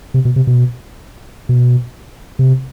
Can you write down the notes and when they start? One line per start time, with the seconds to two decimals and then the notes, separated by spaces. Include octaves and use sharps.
0.14 C3
0.25 B2
0.36 C3
0.47 B2
1.49 B2
2.39 C3